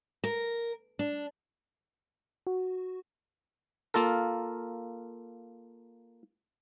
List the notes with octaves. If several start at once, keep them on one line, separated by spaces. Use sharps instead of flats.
A#4
D4
F#4
A#3 F4 A4 A#4